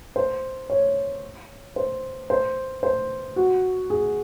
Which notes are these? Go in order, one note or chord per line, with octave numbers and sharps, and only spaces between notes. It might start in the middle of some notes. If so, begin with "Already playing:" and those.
C5
C#5
C5
C5
C5
F#4
G#4